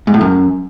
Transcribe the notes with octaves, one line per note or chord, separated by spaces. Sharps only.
G#2
A2
F#2